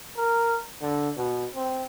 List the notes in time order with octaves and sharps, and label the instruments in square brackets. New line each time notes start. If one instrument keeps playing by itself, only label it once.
[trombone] A#4
D3
B2
C4